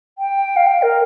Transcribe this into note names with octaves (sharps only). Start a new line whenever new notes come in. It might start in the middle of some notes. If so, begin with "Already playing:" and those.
G5
F5
G5
A#4